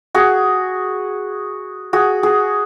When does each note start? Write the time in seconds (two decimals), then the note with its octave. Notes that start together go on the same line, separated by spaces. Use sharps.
0.15 F#4 G#4
1.93 F#4 G#4
2.23 F#4 G#4